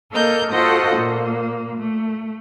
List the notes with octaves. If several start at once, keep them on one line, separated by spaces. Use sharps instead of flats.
A#3 A4 A#4 D#5 F6 G6
F4 F#4 A4 C5 D#5 F#5
A#2 A#3
A3